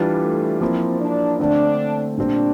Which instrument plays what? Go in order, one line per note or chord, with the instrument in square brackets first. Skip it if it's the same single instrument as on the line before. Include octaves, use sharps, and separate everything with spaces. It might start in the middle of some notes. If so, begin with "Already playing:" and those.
Already playing: [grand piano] E3 G3 D4 F4
[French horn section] A3
[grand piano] F3 A#3 E4 [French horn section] C4
[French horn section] D4
[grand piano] D3 A3 C4 [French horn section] D4
[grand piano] A#2 G3 C4 [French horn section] D4